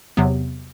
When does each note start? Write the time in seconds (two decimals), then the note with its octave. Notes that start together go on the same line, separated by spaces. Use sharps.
0.17 E2 C3 F#3 B3